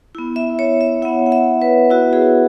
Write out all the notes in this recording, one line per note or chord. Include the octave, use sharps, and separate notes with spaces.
B3 E4
E5
C#5
E5
B3 E4 F#5
F#5
E5
B4
B3 E4 F#4
G#4